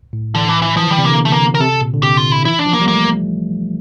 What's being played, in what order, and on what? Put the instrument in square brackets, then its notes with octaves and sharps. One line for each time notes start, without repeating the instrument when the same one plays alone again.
[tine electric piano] A2
[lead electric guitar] D3 [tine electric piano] E3
[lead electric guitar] E3
E3
[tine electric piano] E3 [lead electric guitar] F3
[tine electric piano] D3 [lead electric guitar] G3
[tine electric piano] C3
[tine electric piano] D3 [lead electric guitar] A#3
[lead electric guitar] A3
A#3
A#4
[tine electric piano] C3 [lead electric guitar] A4
[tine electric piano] A#2
D3
[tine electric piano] C3 [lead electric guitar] G4
[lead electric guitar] F4
E4
[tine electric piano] E3 [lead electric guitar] E4
[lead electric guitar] D4
[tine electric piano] F3
[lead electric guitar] A#3
[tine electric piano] G3
[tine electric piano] A3 [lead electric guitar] A#3